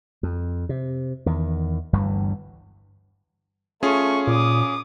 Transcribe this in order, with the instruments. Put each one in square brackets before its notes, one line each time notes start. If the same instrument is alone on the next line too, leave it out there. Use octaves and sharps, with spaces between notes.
[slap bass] F2
C3
E2 D#3
G1 D2 G2 E3
[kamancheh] A3 C#6 [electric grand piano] C#4 F4 G#4
[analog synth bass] A#2 [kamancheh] D6 D#6